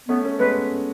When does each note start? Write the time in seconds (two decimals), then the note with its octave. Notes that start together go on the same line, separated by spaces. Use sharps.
0.09 A3 B3 C#4
0.24 A3 C#4
0.39 G#3 B3 B4